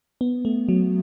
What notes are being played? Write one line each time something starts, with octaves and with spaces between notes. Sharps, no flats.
B3
A3
F#3